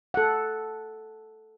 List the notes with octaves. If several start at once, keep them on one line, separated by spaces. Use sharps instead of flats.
A4 F#5